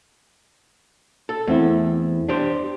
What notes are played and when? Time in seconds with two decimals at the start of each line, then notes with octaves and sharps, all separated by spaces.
1.29 A4
1.47 E2 A3 C4 E4
2.29 D4 G4 C5